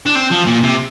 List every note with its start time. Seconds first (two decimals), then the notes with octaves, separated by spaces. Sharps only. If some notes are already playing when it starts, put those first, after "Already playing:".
0.06 D4
0.15 C4
0.31 F3
0.46 A#2
0.63 C3